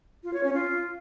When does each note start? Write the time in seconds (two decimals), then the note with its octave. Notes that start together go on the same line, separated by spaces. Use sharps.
0.24 F4
0.33 C#5
0.43 C#4
0.53 F4